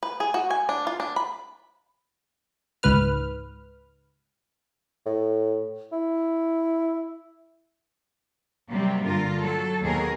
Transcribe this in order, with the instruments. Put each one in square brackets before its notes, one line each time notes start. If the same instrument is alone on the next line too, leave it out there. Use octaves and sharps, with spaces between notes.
[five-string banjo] B4
G#4
F#4
G#5
D4
F4
D4
B5
[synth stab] C#2 G#2 B4 F6
[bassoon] A2
E4
[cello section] C3 F#3 G3 A#3 C4 G4
G2 D3 F4 A#4
F#3 A4
D#2 B2 A#3 G#4 A#4